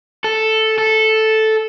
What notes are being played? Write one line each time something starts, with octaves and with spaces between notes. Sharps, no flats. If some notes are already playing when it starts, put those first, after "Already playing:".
A4
A4